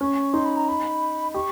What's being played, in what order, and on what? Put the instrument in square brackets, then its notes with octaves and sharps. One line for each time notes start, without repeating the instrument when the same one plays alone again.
[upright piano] C#4 [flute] C#6
[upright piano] D#4 [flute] C6
[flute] B5
A#5
B5
[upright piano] G4 [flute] C#6